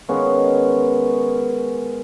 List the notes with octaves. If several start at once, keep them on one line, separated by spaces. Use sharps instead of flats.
D#3 G#3 B3 C#4